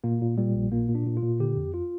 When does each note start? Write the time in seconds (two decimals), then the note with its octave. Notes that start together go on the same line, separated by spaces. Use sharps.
0.04 A#2 A#3
0.22 A#2
0.38 A#2 G3
0.55 A#1
0.72 A#2 A#3
0.89 A#2
0.95 D4
1.06 A#2
1.17 F4
1.23 A#2
1.40 D3 G4
1.57 F2
1.74 F4